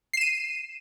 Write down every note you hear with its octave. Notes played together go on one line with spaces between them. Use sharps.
C7 D#7 E7